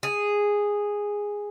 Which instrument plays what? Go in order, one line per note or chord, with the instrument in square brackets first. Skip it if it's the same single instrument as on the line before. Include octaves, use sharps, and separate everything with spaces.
[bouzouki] G#4